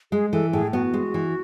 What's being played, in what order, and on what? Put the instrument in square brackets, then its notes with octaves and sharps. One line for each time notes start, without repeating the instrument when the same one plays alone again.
[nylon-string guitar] G#3 [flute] G#4
[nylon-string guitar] E3 [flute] A4
[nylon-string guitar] A2 [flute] G#4
[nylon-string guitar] B3 [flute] F#4
[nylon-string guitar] G#3
E3